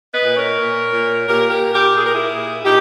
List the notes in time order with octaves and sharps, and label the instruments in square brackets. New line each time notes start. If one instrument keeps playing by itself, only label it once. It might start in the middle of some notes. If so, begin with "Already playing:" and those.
[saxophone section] B4 D#5
A#2
A#4 C#5
A#2
A#2
A#2 G4 A#4
G4 A#4
A#2
G4 A#4
A#2 G#4
A#4
E4 G#4
A#2
A#2 D#4 G4